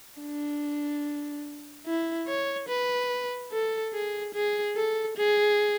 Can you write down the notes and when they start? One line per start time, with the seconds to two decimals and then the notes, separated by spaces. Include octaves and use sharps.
0.21 D4
1.86 E4
2.28 C#5
2.69 B4
3.52 A4
3.93 G#4
4.34 G#4
4.76 A4
5.17 G#4